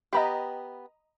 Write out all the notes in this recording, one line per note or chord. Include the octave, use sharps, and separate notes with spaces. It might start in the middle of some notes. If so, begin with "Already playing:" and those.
B3 G4 D#5 A#5 B5